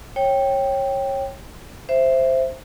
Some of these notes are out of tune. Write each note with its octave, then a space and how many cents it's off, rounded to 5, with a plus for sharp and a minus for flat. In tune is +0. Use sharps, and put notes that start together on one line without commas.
C#5 -20 G5 +0
C5 +0 E5 +15